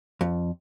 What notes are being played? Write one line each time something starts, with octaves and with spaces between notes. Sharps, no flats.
F2